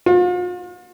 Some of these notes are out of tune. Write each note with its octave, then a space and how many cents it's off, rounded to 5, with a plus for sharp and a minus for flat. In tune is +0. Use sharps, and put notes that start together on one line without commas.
F4 +45